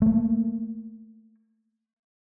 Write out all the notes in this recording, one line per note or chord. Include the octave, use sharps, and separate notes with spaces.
A3 A#3